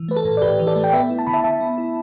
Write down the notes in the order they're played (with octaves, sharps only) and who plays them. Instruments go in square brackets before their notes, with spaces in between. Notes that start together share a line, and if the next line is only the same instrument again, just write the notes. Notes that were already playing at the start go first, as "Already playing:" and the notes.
Already playing: [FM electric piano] E3
A3 B4
A4
A2
D5
A2 G4 B4
E3
A4 D5
A3
G5
B3 B4 E5
E4
A5
D3 B5
E5 A5
D3 E5 A5
B3
E4